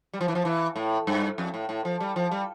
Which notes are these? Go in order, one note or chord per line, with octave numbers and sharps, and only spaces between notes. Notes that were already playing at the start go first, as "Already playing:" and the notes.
G3
F3
E3
F3
E3
A2
G2
F2
A2
A2
F3
G3
F3
G3